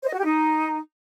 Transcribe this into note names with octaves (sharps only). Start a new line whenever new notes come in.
C5
D#5
F#4
G4
D#4